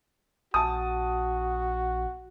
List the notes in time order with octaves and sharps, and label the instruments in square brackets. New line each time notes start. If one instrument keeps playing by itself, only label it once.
[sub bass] A#1 [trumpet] F#4 [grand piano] A5 D#6